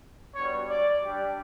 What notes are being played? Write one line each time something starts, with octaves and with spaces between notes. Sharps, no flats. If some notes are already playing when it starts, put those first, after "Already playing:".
G3 B3 D4 F#4 C#5
D5
G3 D4 G4